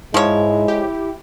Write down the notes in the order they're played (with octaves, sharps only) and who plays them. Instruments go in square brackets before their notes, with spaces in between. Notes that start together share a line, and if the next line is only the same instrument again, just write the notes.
[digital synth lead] G#2 [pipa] F3 C#5 [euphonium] G#3 [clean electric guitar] E4
[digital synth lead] G4